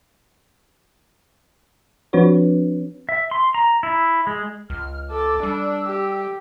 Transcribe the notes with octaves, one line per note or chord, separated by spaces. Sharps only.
F3 C4 D4 F#4 B4 C#5
E5
C6
A#5
E4
G#3
C#2 F6
A4 D6
G3 D4 E6
G4